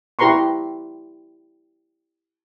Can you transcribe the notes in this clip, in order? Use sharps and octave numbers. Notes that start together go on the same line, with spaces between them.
E4 G4 B4 A#5 C6 C#6